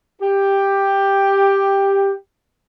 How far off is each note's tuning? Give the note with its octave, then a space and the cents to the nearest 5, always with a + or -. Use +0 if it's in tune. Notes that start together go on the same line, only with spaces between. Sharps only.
G4 +5